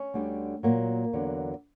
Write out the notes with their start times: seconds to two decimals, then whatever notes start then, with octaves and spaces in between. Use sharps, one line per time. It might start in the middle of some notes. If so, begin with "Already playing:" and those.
Already playing: C#4
0.14 D2 D3 G3
0.63 A#2 F#3 A#3
1.13 E2 D3 F#3